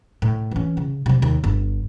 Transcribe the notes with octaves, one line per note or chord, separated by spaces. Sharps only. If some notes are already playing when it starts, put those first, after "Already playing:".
A2
E3 C#4
C#3
C3 G3
D#2
G1